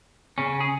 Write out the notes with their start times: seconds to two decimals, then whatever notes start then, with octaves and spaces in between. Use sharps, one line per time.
0.38 C#3 C#4
0.60 G#4